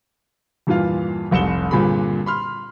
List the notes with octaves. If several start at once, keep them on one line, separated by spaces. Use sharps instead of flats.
E2 G2 A#2 E3 F4 F5
F1 C2 C#7 E7 G7
G2 A#2 D3 C4 G#4 B5
B5 C6 F6